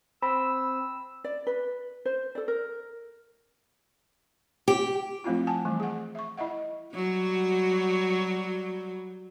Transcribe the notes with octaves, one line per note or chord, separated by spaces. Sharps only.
C4 B5 E6
D5
B4
C5
A4 D5
A#4
G4
F3 A3 C4 E4 F4
F#5 G#5 A5
E3 G3 A3
G#4 F#5
E5 C#6
E4 D#5 E5 F#5
F#3 G3 F#4